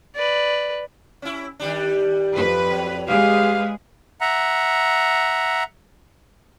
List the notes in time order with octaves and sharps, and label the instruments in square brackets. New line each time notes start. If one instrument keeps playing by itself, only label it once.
[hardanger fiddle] B4 D5
[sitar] C#4 E4
D#3 G3 D4
[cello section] F2 B4
[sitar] F#3
[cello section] G#3 G#4 B4 [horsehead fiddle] G4 F5
[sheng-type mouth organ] E5 F#5 A#5